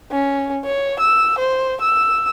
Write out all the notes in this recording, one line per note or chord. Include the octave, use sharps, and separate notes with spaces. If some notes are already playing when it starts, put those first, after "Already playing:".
C#4
C#5
E6
C5
E6